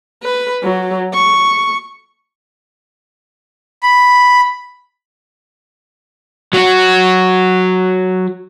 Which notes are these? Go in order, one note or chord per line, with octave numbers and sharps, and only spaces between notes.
B4
F#3
C#6
B5
F#3 F#4